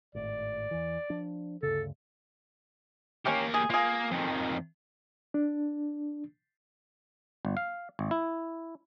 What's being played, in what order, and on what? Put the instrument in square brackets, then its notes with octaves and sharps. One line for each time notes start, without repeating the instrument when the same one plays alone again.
[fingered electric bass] G#1 A2 [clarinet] D5
[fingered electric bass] E2 E3
F3 D4
[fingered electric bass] D2 G2 C#3 [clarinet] A4
[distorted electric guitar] A#3 G4 [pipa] C#4 A#4
[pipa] G#4
[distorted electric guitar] A#3 [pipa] F4 G#4
[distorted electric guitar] F2 D#3
[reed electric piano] D4
[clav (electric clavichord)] G1
F5
G#1
E4